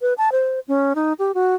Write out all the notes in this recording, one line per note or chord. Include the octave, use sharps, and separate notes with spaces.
B4
A5
C5
C#4
D#4
G4
F#4